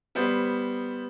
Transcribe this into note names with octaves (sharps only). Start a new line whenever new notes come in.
G3 B3 C5